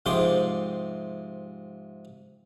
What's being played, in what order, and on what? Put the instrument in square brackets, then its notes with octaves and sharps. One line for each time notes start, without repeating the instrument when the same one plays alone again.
[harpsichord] G#2 C3 F3 G#4 C6 D6